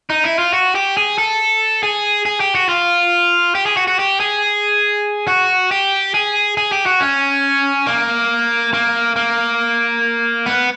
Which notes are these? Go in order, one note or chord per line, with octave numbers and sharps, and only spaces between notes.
D#4
E4
F4
F#4
G4
G#4
A4
G#4
G#4
G4
F#4
F4
G4
G#4
F#4
F#4
G4
G#4
F#4
G4
G#4
G#4
G4
F#4
C#4
A#3
A#3
A#3
B3